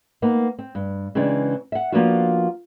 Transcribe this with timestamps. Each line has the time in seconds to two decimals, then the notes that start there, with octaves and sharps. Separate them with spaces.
0.22 A#3 B3 D#4
0.59 C4
0.75 G2
1.15 C#3 E3 G#3 C4 D4
1.72 E5 F#5
1.92 F3 A#3 B3 D4 F4 F#4